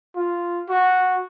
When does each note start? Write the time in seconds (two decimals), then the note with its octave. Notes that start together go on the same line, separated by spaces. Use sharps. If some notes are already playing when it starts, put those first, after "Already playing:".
0.16 F4
0.69 F#4